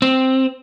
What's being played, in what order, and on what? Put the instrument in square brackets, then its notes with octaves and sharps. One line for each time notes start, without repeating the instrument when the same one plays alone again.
[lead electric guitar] C4